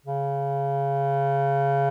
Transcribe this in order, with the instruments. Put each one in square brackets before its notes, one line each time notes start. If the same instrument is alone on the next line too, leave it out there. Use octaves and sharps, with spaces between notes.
[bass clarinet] C#3